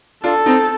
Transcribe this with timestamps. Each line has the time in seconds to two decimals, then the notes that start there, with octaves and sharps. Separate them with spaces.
0.24 D4 F4 A4
0.46 C4 D#4